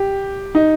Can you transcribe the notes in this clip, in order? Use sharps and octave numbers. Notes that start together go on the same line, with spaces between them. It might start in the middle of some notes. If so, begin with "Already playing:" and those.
Already playing: G4
D#4